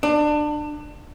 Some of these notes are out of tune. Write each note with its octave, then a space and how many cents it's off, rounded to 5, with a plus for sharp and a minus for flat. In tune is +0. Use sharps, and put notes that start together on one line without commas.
D4 +25